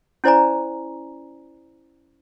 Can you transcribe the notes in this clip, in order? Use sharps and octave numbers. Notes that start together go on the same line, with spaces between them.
C#4 E4 C5 D5 G#5 A#5